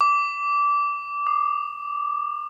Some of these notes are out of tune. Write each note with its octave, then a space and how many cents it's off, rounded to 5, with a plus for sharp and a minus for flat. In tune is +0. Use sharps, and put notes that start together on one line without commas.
D6 -20
D6 +40